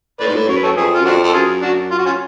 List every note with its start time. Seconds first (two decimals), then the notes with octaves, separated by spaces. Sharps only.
0.20 A2 B4 D5
0.27 G#2
0.35 A2
0.48 F#2 C#5
0.56 B4
0.64 A4 C#5
0.76 F2 G#4 B4
0.94 F4
1.00 F#2
1.05 F2 D4 F#4
1.24 F2
1.29 A4
1.33 F#2 F4 G#4
1.62 D4 F#4
1.91 F4
1.98 F#4
2.06 C#4 F4